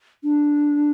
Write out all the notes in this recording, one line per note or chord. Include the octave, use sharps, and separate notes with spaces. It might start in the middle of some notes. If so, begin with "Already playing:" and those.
D4